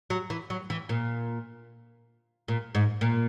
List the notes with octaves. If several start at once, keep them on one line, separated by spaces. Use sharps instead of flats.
F#3
E3
F#3
E3
A#2
A#2
G#2
A#2